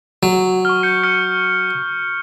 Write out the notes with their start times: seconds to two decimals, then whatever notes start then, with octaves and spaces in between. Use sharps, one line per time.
0.23 F#3
0.65 C#6 F6
0.83 G6 C#7
1.04 F6 C#7